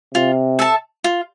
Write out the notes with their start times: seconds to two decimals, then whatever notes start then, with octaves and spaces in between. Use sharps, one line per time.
0.14 C3 F4
0.59 A4 E5 A5
1.04 F4